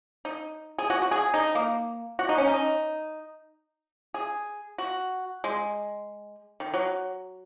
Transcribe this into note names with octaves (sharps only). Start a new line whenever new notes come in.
D#4
G#4
F#4
F#4
G#4
D#4
A#3
F#4
D#4
C#4
D#4
G#4
F#4
G#3
D#3
F#3